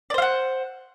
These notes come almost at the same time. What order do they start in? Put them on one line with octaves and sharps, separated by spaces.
D5 C5 F5 F#5